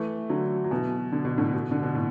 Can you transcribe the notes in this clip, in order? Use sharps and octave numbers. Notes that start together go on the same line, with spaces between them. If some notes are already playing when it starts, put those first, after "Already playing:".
Already playing: E3 A3
D3 F#3
F#3
B2 E3
D3
B2
A2 D3
B2
D3
B2
A2